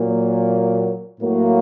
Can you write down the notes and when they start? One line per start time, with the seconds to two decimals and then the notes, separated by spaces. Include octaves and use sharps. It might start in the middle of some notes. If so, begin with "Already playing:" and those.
Already playing: A#2 F#3 A#3
1.21 A2 F#3 A#3 F#4